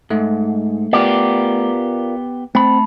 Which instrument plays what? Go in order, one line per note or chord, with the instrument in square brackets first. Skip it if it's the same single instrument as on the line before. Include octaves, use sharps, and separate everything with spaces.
[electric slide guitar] G#2 [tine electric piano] A3
[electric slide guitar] B3 G4 [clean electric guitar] F4 A#4 D5
[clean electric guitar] A3 B5 [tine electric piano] C4